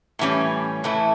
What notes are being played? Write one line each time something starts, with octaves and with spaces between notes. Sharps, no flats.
A2 E3 G3 C#4
A2 E3 A3 E4